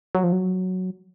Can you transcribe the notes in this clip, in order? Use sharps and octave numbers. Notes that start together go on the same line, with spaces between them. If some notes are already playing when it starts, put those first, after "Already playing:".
F#3
F3
F#3